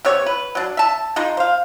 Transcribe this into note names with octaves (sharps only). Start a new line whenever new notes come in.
C3 B3 C#5
B4
F#3 D4
E5 A5
G#3 D#4 F4
C5 F5